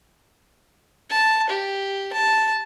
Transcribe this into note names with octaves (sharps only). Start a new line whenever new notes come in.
A5
G4
A5